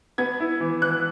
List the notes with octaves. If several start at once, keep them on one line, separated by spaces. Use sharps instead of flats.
B3 G#6
E4
E3
E3 F#6